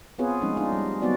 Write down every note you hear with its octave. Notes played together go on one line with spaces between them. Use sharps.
B3 C4 F4 G#4 B4 C#5
F3 G#3 A3 C#4 D#4
D4 D#4 F4
G3
F#3 B3 C4 D#4 F#4 D5